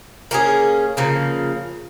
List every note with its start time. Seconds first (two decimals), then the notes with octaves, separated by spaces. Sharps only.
0.31 A#3 C#4 G#4
0.97 C#3 F3 A#3